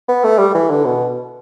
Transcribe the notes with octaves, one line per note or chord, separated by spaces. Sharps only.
B3
A3
G3
E3
D3
B2